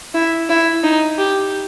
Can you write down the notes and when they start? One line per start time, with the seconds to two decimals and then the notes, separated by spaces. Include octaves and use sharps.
0.14 E4
0.49 E4
0.83 D#4
1.18 G4